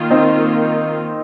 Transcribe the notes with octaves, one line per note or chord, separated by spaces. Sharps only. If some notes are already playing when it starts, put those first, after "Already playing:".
Already playing: D#3 A#3 F4
C4 D#4